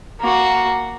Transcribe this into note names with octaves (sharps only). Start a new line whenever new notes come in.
A#3 F#4